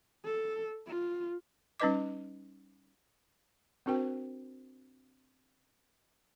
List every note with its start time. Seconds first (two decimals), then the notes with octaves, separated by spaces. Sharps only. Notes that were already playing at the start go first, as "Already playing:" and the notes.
0.25 A4
0.87 F4
1.80 G3 C#4 D#4 B4 D#5 D6
3.86 C4 D4 F#4 A#4 C5 G5